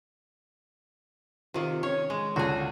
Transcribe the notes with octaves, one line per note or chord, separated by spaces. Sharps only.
C3 D#3 F4
C#4 C#5
G#3
C#2 D3 F#4 G#4